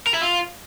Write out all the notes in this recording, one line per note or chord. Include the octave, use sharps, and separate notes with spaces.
A#4
E4
F4